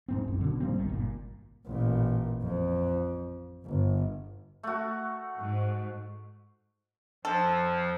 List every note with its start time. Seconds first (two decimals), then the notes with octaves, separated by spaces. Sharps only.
0.08 E1 G#2 C4
0.28 A1 F#2
0.41 B2 D3
0.60 G#2 G3 A#3 C4
0.75 G1 C2 B2 D#3
0.89 G1 A#2
1.67 A1 A#2
2.43 F2
3.65 G1
4.63 A3 F#4
5.38 G#2
7.25 F2 F3 A4